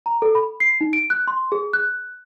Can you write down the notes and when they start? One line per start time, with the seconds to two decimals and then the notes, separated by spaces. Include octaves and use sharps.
0.06 A#5
0.22 A4
0.35 B5
0.60 C7
0.81 D#4
0.93 D7
1.10 F#6
1.28 C6
1.52 G#4
1.73 F#6